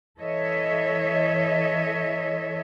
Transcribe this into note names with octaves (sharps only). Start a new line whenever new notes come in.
E3 A4 C#5 D#5 E5